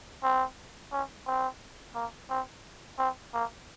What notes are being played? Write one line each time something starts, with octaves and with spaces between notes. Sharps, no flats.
C4
C#4
C4
A#3
C4
C4
A#3